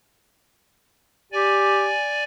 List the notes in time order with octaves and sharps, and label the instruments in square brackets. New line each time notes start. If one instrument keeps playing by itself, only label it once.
[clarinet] G4 [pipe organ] D5 G#5